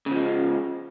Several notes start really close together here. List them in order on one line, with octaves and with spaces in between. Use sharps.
C#3 F3 G#3